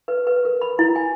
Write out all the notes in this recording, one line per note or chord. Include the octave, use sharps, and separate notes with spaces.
B4
B4
A#4
B5
E4
G#5